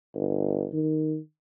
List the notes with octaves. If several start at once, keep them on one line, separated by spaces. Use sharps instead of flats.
G1
D#3